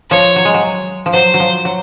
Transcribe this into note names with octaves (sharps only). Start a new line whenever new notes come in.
F3 C#5
F#3
G#3
F#3
F3
F#3 C5
F#3
F3
F#3